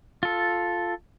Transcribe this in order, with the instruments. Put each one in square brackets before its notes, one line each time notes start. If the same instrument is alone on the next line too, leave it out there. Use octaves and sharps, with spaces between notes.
[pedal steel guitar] F4 A4